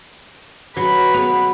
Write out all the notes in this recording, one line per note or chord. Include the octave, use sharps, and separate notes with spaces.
F#3 B4
B3